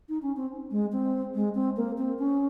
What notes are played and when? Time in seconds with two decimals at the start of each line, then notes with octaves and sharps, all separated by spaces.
0.09 D#4
0.22 C#4
0.36 C4
0.71 G#3
0.92 C4
1.35 G#3
1.55 C4
1.77 A#3
1.98 C4
2.19 C#4